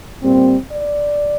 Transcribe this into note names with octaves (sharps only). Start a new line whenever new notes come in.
A#2 G3 C4
D5